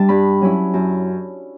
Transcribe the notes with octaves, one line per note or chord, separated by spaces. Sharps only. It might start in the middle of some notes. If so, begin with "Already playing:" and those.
Already playing: G3 D4 D5 E5 A5
G2 B5
F#3 C#4 E4
F#2